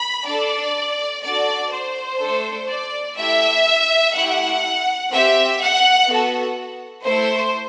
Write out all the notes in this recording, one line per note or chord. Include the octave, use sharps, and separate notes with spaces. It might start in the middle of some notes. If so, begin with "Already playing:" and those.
Already playing: B5
D4 A4 D5
D4 F#4 A4 D5
C5
A3 D4 A4
D5
A3 E4 G4 E5
A3 E4 G4 F#5
C4 G4 E5
F#5
B3 F#4 A4
A3 E4 A4 C5